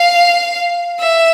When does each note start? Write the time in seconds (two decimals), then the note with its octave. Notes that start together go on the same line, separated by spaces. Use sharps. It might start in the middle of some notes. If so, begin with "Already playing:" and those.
Already playing: F5
1.00 E5